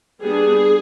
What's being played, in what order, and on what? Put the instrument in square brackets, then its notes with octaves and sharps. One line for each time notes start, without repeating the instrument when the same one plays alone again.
[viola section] G3 B3 D4 G#4